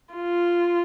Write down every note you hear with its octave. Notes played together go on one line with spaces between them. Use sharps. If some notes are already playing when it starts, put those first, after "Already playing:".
F4